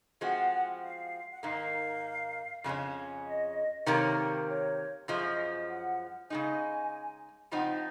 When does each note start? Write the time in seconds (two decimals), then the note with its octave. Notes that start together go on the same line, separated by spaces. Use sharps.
0.21 F3 G#3 C4 F#4 F#5
0.82 F5
1.32 F#5
1.43 G#2 D#3 A#3 F5
2.64 F2 C#3 G#3 C#4
3.26 D#5
3.86 C3 D#3 A#3 C#5
4.48 C#5
5.08 F#2 F3 G#3 D#5
5.69 F#5
6.30 C#3 G#3 D#4 G#5
7.51 C#3 F3 C4 D#4 F#5